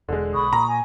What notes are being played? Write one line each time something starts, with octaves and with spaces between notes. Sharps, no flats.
E1 D3 G#3
B1 B5 C#6 D#6
A#2 A#5
G#5